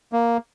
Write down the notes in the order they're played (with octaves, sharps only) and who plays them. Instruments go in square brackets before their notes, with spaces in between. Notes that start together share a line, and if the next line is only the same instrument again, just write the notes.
[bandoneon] A#3